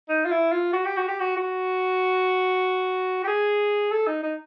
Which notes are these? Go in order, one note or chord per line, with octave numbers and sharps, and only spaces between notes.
D#4
F4
E4
F4
F#4
G4
F#4
G4
F#4
F#4
G4
G#4
A4
D#4
D#4